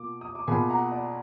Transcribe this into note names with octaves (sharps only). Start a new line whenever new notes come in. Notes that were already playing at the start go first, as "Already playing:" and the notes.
Already playing: B2 A#3 F4 D6
D#6
D6
B2 A#3 F4 G#4 G#5 B5
F#5 A#5
D5